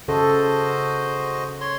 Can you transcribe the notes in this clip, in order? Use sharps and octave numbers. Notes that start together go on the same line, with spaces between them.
C#3 F#4 A4 C5 D#5
C#5 C6